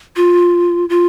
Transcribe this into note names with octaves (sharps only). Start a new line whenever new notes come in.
F4
F4